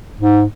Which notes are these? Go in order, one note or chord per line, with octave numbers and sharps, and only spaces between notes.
G#2